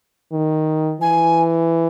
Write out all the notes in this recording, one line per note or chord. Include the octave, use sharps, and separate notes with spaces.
D#3
E3 G#5